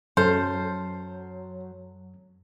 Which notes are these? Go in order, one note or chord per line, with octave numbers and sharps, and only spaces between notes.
F#2 F#3 A4 C5 F6